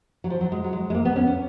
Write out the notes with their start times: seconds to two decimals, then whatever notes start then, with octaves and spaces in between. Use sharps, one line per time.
0.24 F#3
0.30 F3
0.41 F#3
0.52 G#3
0.64 F#3
0.73 G#3
0.90 G#3
0.95 A#3
1.05 B3
1.16 C#4
1.27 C#4